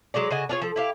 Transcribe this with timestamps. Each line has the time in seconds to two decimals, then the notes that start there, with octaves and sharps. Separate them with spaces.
0.14 F#3 G#3 C#5 D5
0.31 C#3 F#4 D#5 G#5
0.49 D4 F4 G#4 C#5
0.62 F3 A4
0.76 E4 G4 F5